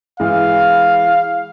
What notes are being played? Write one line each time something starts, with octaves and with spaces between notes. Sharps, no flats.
E3 G#3 F5